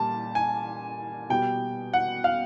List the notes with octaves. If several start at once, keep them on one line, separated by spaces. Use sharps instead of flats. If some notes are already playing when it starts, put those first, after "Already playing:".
Already playing: A#2 G3 A5
G#5
B2 G3 G5
F#5
F5